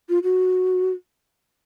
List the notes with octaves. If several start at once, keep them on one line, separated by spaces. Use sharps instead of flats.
F4
F#4